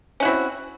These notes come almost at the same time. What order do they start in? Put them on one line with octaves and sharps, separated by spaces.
C#4 F#4 E4 C4